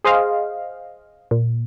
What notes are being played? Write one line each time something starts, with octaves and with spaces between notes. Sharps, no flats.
G#4 C5 D#5 F5
A#2